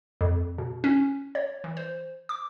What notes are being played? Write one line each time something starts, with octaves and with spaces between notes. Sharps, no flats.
F2
B2
C#4
C#5
E3
C5
D6